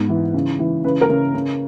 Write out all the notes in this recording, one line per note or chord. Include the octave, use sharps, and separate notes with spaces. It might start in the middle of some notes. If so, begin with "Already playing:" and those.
Already playing: G#2 B3
E3
C#3
E3
C#3 B4
A#4
C#3
C#3